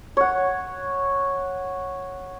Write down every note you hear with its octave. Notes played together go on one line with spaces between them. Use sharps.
C#5 F#5